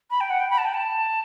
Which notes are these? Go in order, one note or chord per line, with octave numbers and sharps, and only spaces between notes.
B5
G5
F#5
G5
B5
A5
G5
A5